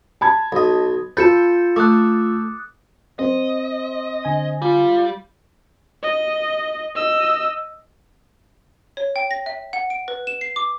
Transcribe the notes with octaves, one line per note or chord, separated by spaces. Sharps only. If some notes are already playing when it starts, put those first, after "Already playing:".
A5 B5 G#6
B1 D#5
F4 A4 B4 G6 A6 C#7 E7
A3 D6 D#6 F#6
C4 D#5
D3 G#5 A#6
G3 F4
D#5
D#5 E6
C#5
G5
A#6
E5
F#5
D7
B4
E7
C7
D6